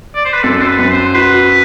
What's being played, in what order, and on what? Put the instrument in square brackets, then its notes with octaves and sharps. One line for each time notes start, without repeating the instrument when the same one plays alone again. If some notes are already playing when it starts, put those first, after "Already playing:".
[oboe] D5
C5
B4
[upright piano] F#2 [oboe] A4
[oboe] C5
B4
[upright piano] F#2
[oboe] C5
[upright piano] F#4 [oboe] B4